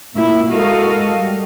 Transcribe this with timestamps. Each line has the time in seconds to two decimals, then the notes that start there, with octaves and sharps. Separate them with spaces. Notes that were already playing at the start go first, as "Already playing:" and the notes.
0.15 A#2 E4
0.51 G#3 F#4 A4 A#4 D#5 F5
1.15 G3